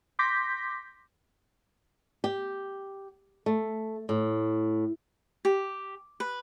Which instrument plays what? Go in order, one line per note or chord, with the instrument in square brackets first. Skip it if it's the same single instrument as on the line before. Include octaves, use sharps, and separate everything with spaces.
[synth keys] C6 D6 G6 A#6 B6
[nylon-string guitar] G4
A3
A2
[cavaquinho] G4
B4